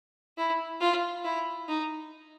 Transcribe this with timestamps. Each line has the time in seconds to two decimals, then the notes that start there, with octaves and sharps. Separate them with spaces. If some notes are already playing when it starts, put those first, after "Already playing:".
0.38 E4
0.81 F4
1.24 E4
1.68 D#4